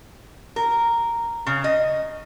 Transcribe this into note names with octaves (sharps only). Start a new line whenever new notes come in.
A#4
C#3
D#5